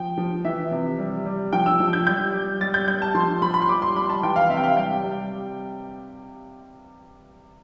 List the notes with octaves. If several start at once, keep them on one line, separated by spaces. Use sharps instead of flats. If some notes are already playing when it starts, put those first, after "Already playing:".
Already playing: F3 G5
F3
E3 E5
C3
G3
G3
F3 G5
E6
F3
G6
G3 G6
G3
G3 A6
G6
G3 G6
A5
F3 C6
F3 B5
B5
C6
G3 D6
C6
G3 B5
A5
E3 G5
F5
C3 E5
G5
F5
G3 G5
G3